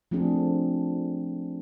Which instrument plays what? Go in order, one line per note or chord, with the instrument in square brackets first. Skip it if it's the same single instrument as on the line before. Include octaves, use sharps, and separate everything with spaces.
[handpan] F3 A3 C4 D4 G#4